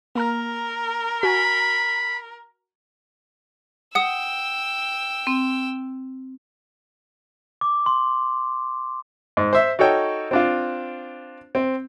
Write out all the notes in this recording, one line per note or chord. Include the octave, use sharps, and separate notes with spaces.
A#3 A#4 A#5 F6
F#4 G#5 B5
F#5 G5 D#6 E6
C4
D6
C6
G#2
C5 E5
D#4 F#4 A4 C#5 G5
C4 D4 F4
C4